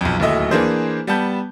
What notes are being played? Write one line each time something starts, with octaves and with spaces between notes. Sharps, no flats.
B1 F2
D1 D#2 F#3 A3 D#5 E5
E3 A#3 D4 G#4 C5
G3 B3 A5 G6